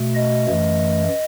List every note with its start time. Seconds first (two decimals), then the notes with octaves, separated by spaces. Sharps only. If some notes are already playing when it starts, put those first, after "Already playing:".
Already playing: B2 A3
0.16 D#5
0.47 F#2 E3 A3